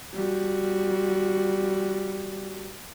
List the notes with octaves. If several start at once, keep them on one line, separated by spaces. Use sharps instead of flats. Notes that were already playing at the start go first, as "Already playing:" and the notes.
G3 F#4